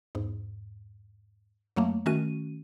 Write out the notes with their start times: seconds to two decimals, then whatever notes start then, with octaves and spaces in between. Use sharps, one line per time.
0.15 E2 G#2
1.76 F#2 F#3 A3 A#3
2.06 D#3 A3 C#4 F#4 D#7